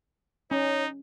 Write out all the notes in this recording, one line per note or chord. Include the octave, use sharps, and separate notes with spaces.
C#4 D#4 C#5